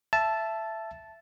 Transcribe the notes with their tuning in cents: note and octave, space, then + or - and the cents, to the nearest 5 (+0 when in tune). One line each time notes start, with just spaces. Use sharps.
E5 +15 A5 -5